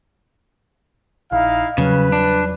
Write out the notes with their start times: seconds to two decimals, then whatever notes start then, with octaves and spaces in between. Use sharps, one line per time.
1.32 A#1 D#4 E4 F5
1.78 E2 C#3 F#3 G3 B4
2.12 D4